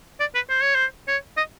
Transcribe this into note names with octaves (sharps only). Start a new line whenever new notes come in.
D5
B4
C5
C#5
C5
C#5
D#5